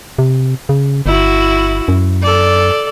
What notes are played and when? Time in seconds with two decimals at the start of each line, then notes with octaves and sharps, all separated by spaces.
0.19 C3
0.69 C#3
1.06 G1 E4 F#4
1.88 F#2
2.22 A4 D5